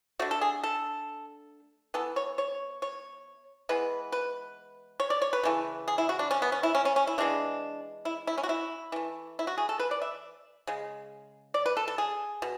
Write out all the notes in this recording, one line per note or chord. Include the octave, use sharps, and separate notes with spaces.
D3 A3 F#4
A4
G#4
A4
E3 B3 A4
C#5
C#5
C#5
E3 G#3 B3 B4
B4
C#5
D5
C#5
B4
C#3 E3 A3
G#4
E4
F#4
D4
C#4
B3
C#4
E4
C#4
C#4
C#4
E4
E3 G#3 B3 D4
E4
E4
C#4
F#4
E4
E3 A3
E4
F#4
G#4
A4
B4
D5
E5
C#3 G#3
D5
B4
A4
A4
G#4
B2